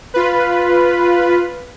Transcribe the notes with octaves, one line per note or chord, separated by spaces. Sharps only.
F4 B4